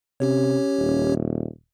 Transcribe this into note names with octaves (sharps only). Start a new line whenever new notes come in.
C3 C#4 G4 C#5
D#1